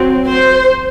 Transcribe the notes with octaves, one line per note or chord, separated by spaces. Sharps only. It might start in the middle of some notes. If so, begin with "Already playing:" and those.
Already playing: F#3 C4
C5